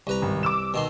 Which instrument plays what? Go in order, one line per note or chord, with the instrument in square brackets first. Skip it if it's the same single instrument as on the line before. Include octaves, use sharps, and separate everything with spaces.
[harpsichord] C2 B4 A#5
[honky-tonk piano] G#1
D6 E6 E7
[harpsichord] B2 D#3 C6